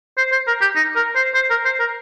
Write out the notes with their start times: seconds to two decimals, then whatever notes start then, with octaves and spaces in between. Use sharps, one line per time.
0.18 C5
0.32 C5
0.47 A#4
0.61 G4
0.76 D#4
0.96 A#4
1.16 C5
1.34 C5
1.50 A#4
1.65 C5
1.80 A#4